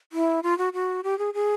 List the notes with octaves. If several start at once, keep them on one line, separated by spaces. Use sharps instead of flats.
E4
F4
F#4
F#4
G4
G#4
G#4